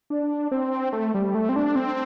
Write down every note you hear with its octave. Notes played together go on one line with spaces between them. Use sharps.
D4
C4
A3
G3
A3
C4
D4
C4